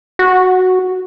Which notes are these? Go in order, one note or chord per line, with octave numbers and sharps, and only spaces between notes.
F#4